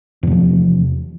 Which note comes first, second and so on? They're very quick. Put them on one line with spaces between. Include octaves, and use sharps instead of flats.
E2 C3 F3